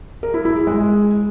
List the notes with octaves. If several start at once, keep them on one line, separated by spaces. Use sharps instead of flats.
A#4
E4
E4
G#4
G#3